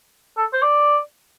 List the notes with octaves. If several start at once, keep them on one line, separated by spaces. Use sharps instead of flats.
A4
C5
D5